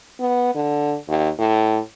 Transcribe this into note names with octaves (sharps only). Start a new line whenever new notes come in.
B3
D3
D#2
A2